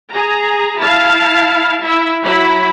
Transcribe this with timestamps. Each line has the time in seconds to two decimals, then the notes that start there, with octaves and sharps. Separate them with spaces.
0.11 G#4 A#5
0.80 E4 F5 A5
1.83 E4 E5
2.22 F#3 E4 B5